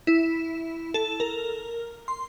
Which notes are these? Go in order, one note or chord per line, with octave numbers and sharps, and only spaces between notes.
E4
A4
A#4
C6